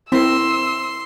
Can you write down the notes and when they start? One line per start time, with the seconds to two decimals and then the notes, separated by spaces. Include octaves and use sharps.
0.12 C4 E4 A#4 C6 E6